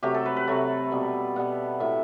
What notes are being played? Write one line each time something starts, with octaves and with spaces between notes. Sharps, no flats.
C3 F#3 A3 G4
A4
B4
B4
C3 F#3 A3
B2 G3 B3
B2 G3 B3 F#5
A2 F#3 A3 E5